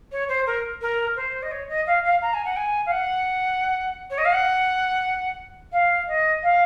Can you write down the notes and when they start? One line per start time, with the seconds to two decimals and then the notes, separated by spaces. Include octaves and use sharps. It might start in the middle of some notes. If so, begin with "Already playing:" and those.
0.11 C#5
0.28 C5
0.46 A#4
0.81 A#4
1.16 C5
1.42 D#5
1.51 C#5
1.68 D#5
1.86 F5
2.04 F5
2.22 A#5
2.34 G#5
2.45 F#5
2.56 G#5
2.86 F5
2.91 F#5
4.10 C#5
4.18 D#5
4.25 F5
4.32 F#5
5.72 F5
6.07 D#5
6.43 F5